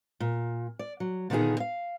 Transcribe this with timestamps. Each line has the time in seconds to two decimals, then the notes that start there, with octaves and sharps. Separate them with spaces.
0.20 A#2
0.79 D5
1.00 F#3
1.30 A#2 D3 D#3 B3 D#4 G#4
1.60 F5